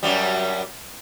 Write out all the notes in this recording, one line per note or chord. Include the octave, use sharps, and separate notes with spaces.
F#2 F#3 G3